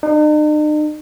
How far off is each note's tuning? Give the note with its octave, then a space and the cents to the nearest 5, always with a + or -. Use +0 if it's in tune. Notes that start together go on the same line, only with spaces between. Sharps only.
D#4 -45